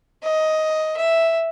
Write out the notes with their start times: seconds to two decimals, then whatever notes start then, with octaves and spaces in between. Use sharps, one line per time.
0.24 D#5
0.97 E5